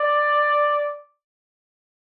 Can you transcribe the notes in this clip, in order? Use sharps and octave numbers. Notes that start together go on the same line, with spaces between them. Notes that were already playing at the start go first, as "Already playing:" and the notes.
Already playing: D5